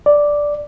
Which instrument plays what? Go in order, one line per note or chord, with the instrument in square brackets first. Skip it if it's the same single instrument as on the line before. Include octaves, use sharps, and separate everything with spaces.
[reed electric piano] D5